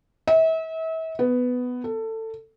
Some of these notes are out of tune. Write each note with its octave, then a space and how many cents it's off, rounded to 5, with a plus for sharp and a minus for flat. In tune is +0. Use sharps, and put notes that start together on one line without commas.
E5 -35
B3 +10
A4 +20